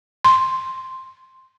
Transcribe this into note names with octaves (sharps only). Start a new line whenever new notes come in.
C6